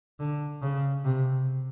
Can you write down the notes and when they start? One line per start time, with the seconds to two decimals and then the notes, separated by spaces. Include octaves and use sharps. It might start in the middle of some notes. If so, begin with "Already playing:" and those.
0.20 D3
0.62 C#3
1.05 C3